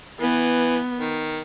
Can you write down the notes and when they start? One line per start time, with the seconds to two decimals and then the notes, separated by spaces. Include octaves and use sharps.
0.19 E3 B3
0.99 D#3